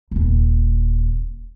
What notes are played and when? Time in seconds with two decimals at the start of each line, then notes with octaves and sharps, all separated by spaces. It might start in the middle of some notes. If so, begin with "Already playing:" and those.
0.11 D#1 G#1